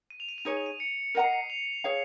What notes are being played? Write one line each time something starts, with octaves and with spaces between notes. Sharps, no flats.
D#7
F7
D#7
F7
D#4 G#4 C#5 D#7
F7
D#7
C#7
A#4 D#5 F#5 A#5 C#7
C7
C#7
F7
G#4 C#5 F5